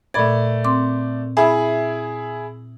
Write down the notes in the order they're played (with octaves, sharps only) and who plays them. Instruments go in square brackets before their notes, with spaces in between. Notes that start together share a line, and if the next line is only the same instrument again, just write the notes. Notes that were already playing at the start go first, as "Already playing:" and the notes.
[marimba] A#2 B5 G#6 [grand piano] A3 D5
[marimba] C4 C6 D6
[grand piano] E4 G#4 [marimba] E5 G#5 B5